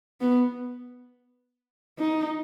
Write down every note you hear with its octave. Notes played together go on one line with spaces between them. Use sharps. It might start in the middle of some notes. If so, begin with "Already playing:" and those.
B3
D#4